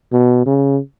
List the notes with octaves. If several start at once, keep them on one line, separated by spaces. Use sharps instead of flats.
B2
C#3